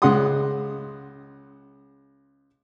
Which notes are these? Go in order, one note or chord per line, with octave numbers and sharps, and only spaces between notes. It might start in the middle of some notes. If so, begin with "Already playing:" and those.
C#2 G#3 F#5 C6 D#6